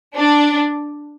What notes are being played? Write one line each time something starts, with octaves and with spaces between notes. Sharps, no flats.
D4